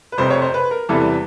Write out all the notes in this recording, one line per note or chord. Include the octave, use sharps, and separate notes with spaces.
B4
F1 F2 C3 C5
C#5
C5
B4
A#4
E2 C3 E3 G3 B3 A4